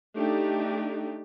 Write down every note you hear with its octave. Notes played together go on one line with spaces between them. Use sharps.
A3 D4 D#4 G4